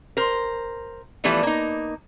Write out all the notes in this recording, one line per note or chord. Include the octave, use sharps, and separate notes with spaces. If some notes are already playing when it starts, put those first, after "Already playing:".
A#4 C5
E3 F3 G3 A3 B3
A#3 D#4